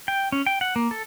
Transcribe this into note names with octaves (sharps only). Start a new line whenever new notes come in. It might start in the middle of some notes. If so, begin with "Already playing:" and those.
G5
C#4
G5
F#5
A#3
A4